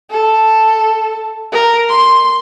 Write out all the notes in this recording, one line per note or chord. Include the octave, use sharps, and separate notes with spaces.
A4
A#4
C6